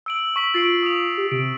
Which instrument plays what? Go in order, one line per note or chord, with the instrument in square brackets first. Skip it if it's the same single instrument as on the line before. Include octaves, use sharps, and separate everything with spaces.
[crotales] E6 D7 F#7
C#6 B6 F#7
[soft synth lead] F4 [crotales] A6 C7 D7
[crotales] D#6 F7
[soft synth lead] G4
[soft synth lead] C3 [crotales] D7